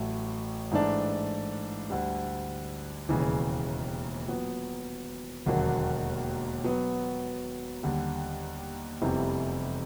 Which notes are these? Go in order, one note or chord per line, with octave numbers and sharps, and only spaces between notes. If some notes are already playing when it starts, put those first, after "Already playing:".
Already playing: A1 A2 F#3 A3
G#2 E3 A3 D4
D2 D3 G3
E1 D#2 C#3 E3
A#2 F#3 B3
E1 D#2 D3 F#3 A#3
B2 F#3 B3
D#2 D3 G3
F1 E2 C3 E3 G3